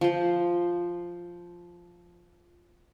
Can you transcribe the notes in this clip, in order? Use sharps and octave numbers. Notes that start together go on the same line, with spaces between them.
F3 C5